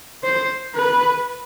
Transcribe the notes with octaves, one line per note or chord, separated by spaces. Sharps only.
C5
B4